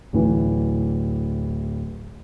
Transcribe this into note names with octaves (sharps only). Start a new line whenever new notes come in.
D1 E3